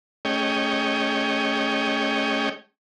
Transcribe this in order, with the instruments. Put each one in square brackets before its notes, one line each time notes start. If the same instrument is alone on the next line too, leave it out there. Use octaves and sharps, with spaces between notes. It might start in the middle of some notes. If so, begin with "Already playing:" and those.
[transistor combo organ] A3 C#4 G#4 C#5 D#5 G5